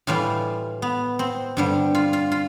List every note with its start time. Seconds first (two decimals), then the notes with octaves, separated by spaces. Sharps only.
0.07 A2 E3 G3 F4
0.82 B3
1.19 C4
1.57 G2 D3 G3
1.95 F4
2.13 F4
2.32 F4